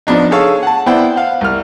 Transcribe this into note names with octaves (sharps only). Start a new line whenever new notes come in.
F3 B3 D4 D#4
G#4 A4 C#5 F5 C#6
F#5 A5
B3 E4 C5 D5 F#5 G5
F5 F#5
C2 F6